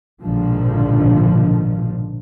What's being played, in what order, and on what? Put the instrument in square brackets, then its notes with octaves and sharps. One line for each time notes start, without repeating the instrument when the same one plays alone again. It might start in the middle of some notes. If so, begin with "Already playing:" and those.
[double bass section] A#1 G#2 B2 D3 D#3 F3